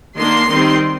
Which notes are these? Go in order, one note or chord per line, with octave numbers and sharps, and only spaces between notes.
D#3 A#3 D4 C6
D#3 G3 C4